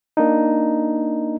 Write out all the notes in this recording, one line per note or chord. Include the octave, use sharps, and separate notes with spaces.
A#3 D4 D#4